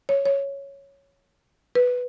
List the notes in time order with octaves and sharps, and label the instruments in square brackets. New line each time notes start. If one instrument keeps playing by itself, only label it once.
[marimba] C#5
C#5
B4